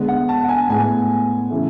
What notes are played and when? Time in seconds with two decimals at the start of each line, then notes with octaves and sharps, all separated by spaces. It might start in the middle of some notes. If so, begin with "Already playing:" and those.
Already playing: D3 G#3 B3
0.08 F#5
0.29 A5
0.44 F#5
0.49 G#5
0.69 A2 G#3 B3 G#5
1.50 C#3 E3 A3